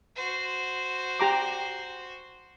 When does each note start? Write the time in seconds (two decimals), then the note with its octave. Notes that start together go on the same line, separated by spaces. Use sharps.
0.16 F#4 C5
1.20 G4 A#5 D6